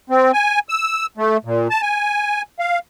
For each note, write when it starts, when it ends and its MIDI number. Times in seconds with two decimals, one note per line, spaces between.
0.10 0.32 60
0.33 0.59 80
0.69 1.06 88
1.17 1.37 57
1.45 1.68 46
1.70 1.81 81
1.82 2.42 80
2.59 2.79 77